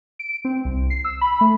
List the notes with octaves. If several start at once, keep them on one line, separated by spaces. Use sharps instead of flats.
D7
C4
C2
C7
E6
B5
A3